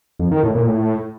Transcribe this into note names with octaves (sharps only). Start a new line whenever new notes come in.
F2
D#3
A2
A#2
A2